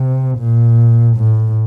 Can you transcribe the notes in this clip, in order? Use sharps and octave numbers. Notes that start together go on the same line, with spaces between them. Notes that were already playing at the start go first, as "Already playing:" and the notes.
Already playing: C3
A#2
A2